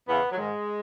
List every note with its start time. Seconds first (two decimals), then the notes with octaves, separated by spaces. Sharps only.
0.08 E2 C#3 E3 B3
0.31 F#3
0.37 G#2 D#3 G#3